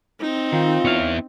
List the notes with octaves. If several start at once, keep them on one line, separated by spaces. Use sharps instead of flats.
C4 D#4
D#3 F4
B3 E4 C#5 F5